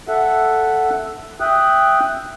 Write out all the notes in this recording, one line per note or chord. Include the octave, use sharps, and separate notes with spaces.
A4 E5 F#5
E5 G5 D#6 F#6